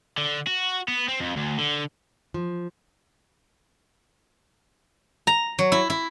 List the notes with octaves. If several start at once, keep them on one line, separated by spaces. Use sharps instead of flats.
D3
F#4
B3
C4
F2
D2
D3
F3
A#5
F#3
E4
E4